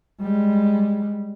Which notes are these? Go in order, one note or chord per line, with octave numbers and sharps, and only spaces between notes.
G3 G#3